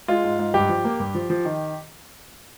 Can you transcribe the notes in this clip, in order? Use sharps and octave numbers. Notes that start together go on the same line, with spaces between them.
G#3 F4
G#2
G#2
G2 G4
F3
A#3
G2
F3
F3
D#3